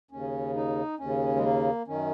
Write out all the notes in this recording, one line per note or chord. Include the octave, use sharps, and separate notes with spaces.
D#2 C#3 C#4
D#4
D#2 C#4
C#3
G#3
A#3
F#2 D#3 C#4